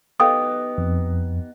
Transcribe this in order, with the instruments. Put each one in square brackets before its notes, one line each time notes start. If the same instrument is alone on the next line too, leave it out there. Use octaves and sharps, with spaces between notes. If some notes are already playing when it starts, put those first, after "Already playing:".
[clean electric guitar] B3 D#4 G4 [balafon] A4 F5 G5 [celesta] D#6
[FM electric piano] F2